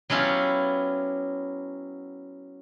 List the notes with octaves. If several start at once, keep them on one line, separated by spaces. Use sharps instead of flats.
F#3 B3 C#4 E4 F4 G4